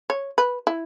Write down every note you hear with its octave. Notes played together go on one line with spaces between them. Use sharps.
C#5
B4
E4